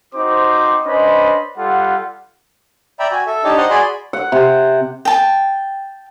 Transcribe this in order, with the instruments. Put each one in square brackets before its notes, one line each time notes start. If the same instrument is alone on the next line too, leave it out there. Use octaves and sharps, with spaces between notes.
[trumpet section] C4 D#4 F#4 C5 D6
C#4 D4 B4 C5 D#5 B5
G3 F4 A4 F#5
[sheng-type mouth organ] D5 E5 G5 A#5 B5
F#4 G#5
A4 E5
D4 D#4 G4 C#5 D#5 A5
C5 D#5 F#5 A#5 C6
F#4 G#4 D5 G#5 B5 C6
[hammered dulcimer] F#5
C3
[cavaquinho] G5 A5